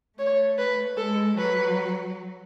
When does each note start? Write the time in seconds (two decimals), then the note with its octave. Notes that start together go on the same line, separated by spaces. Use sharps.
0.19 A3 C#5
0.58 B4
0.97 G#3 A4
1.37 F#3 B4